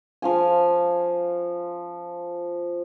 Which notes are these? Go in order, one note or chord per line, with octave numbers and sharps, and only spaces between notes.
F3 F5 G#5